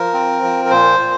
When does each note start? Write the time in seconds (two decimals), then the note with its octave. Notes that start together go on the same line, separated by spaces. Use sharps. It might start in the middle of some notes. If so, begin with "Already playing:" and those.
Already playing: F3 A#4
0.14 C4
0.43 F3
0.65 A#4
0.71 A#2 C5
0.99 A#2